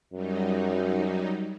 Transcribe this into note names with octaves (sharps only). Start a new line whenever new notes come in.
F#2 F#3 G3 D#4